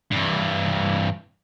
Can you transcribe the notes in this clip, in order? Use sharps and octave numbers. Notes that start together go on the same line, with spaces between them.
G2 E3